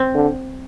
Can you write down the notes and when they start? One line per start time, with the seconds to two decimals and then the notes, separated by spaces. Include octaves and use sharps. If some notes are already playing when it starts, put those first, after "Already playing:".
Already playing: C4
0.15 D3